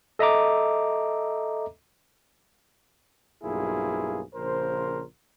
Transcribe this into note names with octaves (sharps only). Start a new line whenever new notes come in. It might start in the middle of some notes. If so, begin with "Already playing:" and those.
A4 D#5 E5 A#5 D6
B1 G2 A#3 E4 F4 G#4
A#1 C#3 A#4 C5